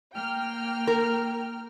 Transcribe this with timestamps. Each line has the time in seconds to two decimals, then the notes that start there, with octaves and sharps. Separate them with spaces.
0.14 A#3 G5 F6
0.87 A#4